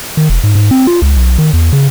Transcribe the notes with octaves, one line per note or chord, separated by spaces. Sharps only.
D#3
F1
G#2
G#2
C4
F4
C#2
B1
D#3
E2
C#3